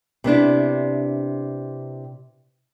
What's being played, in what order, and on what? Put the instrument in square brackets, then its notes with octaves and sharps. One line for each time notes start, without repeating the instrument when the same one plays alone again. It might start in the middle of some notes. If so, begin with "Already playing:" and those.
[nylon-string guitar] C3 B3 D4 E4